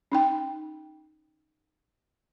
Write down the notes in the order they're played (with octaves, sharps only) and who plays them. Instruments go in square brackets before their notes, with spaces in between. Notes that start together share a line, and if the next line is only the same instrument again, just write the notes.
[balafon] C#4 D#4 G5